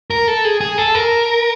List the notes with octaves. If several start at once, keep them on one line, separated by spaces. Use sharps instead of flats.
A#4
A4
G#4
G#4
A4
A#4